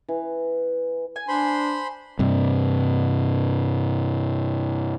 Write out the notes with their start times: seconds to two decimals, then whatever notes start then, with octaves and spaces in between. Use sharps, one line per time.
0.09 E3
1.16 G#5
1.28 D4 C5 B5 C6
2.19 G2 C3